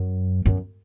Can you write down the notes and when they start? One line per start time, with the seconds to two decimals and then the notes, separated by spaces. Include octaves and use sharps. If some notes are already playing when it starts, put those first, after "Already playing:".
Already playing: F#2
0.46 F#2